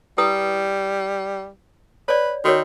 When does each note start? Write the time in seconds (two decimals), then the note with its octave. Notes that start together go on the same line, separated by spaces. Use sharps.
0.18 G3 E4 B4 D#6
2.08 B4 C#5 D5
2.45 D#3 F#4 A#4 C#5